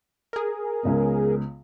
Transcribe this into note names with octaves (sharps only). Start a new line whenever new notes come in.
G#4 A#4
C#2 C#3 B3